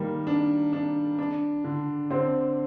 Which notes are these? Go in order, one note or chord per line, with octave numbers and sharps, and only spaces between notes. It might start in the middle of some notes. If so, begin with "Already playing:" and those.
Already playing: D#3 G3 A#3
D4
D4
D4
D3
D3 C4